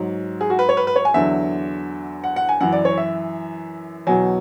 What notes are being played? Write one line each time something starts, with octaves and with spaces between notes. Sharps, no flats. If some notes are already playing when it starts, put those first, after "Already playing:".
Already playing: G#2 F#3
G#4
F#4
B4
C#5
B4
B4
C#5
G#5
E2 D3 F#3 E5
F#5
F#5
G#5
F#2 E3 F#5
D5
C#5
E5
E2 B2 F#3 G#5